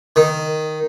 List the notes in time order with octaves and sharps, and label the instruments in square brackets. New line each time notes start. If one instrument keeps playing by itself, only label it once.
[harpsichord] D#3